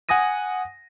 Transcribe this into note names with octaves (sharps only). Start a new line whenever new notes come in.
F#5 G#5 D#6 A#6 D#7